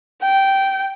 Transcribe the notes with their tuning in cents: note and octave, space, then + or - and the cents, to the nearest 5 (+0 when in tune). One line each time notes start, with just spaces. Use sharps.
G5 -10